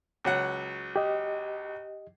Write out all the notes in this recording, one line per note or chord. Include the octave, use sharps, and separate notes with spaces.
C#2 F#3 F#5
G4 D#5